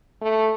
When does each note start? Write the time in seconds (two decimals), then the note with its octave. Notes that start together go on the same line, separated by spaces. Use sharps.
0.21 A3